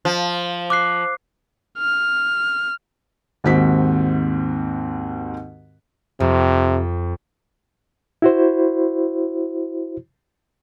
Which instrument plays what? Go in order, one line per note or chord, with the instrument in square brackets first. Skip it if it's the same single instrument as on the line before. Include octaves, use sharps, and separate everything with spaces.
[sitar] F3
[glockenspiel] D6 F#6 C7
[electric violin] F6
[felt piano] D#2 G#2 D#3 C4 F#4 B6
[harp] F2 [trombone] C3
[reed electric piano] E4 F#4 C5